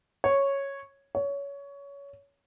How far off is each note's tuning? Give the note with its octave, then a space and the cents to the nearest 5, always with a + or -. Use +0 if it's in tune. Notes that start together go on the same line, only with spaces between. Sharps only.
C#5 -5
C#5 +20